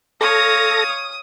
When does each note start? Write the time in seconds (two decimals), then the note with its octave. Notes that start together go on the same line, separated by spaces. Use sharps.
0.21 A4 C#5 F5 D#6 A#6